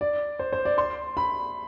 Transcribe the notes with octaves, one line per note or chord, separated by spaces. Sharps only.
D5
C5
C5
D5
C6
B5